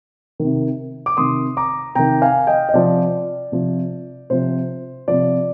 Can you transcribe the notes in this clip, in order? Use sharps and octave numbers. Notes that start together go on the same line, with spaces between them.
C3 D#3
D6
C3 D#3 C6 D#6
A#5 D6
C3 D#3 G5 A#5
F5 G#5
D#5 G5
D#5
C3 F3 D5
C3 F3
C3 F3 C5
C3 F3 D5